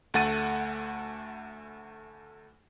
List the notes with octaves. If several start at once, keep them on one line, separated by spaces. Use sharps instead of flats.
D2 A3 F#5 A6 D#7